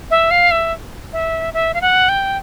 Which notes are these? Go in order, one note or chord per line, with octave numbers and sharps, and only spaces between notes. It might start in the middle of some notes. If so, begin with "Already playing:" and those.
E5
F5
E5
E5
E5
F5
F#5
G5